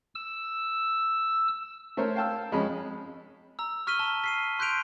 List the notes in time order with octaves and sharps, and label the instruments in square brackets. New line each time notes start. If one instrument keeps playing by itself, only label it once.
[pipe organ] E6
[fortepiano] A3 A#4 C5 C#5
F5 G5 A5 E6
F2 G#3 C#4 B5
[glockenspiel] A#5 E6
C#6 F6 B6 D#7 G7
A5 G7
B6 C7 D#7
C6 F#6 G6 B6 D7 F7